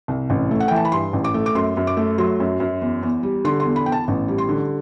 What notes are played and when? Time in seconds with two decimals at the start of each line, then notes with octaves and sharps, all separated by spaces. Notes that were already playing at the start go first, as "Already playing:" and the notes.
0.08 C2
0.30 A1
0.51 A3
0.60 F#5
0.68 E3 G5
0.76 A5
0.85 B5
0.92 G2 C6
1.13 A1
1.24 D6
1.34 A3
1.46 D6
1.55 F#2 C6
1.77 F#2
1.87 D6
1.97 A3
2.18 F#3 C6
2.40 F#2
2.60 F#2
2.81 E2
3.03 E2
3.23 G3
3.45 D3 C6
3.60 C6
3.65 E2
3.76 B5
3.86 E2 G5
3.92 A5
4.08 A1
4.28 G3
4.38 C6
4.49 D3